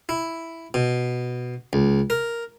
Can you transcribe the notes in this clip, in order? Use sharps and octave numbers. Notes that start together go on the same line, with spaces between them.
E4
B2
C#2
A#4